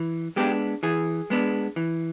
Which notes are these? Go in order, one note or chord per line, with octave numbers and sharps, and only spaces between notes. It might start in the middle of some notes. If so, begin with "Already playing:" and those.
Already playing: E3
G#3 B3 D4 G4
E3 G#4
G#3 B3 D4
E3